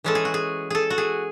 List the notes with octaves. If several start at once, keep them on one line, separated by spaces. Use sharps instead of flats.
E3 G#3 C#4 A4
G#4
F#4
G#4
G#4 A4
F#4
G#4